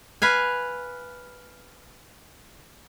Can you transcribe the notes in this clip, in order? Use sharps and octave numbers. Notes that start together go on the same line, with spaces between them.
B4 F5 G#5